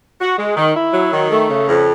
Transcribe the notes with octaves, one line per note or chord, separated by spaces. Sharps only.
F#4
G#3
D#3
E4
F#3
D#3
A3
C#3
F2